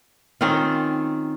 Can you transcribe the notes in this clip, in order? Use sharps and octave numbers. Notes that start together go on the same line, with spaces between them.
D#3 C4 C#4 F4